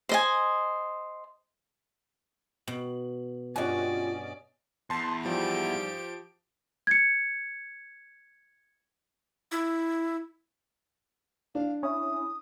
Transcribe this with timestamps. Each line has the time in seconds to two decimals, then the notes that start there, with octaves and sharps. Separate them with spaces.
0.09 C5 D#5 G#5
2.68 B2 F#7
3.56 G2 C#4 F4 F#4 D5 D#5 G#5
4.90 E2 A5 C6
5.26 G#2 F3 G3 G4 D7
6.87 G#6 C#7
9.52 E4
11.55 D4 F5
11.83 C#4 E4 D#6